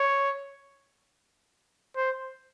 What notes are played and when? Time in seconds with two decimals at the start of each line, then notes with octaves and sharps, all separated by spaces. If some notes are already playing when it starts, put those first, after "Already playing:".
Already playing: C#5
1.96 C5